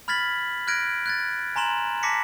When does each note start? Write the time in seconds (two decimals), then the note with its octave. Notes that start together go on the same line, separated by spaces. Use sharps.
0.08 B5 F6 G#6 A6 B6 F#7
0.67 F6 F#6 G#6 A#6 D7
1.06 F#6 G#6 A6
1.56 G#5 A#5 C6 E7 F#7
2.03 A5 D6 A#6 B6 C#7